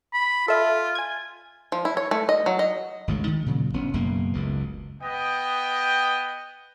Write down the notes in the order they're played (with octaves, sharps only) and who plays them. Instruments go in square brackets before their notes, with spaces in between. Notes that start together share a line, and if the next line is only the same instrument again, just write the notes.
[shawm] B5
[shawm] F4 [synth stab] A4 E5
[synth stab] G#5 G#6
[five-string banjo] F3
E4
C#5
A3
D#5
F#3
D#5
[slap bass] G#1 D2 C#3 G#3
D#3
A#2 C#3 F#3
G1 B3 C#4
F#1 F#2 B2 A#3
F#1 C#2 B2
[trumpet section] B3 D#5 G5